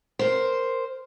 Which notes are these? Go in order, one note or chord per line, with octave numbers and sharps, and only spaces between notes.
A#4 C5